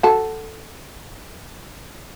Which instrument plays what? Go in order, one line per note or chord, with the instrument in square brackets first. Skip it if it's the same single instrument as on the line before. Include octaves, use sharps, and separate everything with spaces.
[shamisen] F#4 A4